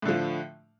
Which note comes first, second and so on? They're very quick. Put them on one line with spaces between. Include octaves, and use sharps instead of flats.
A2 D3 F3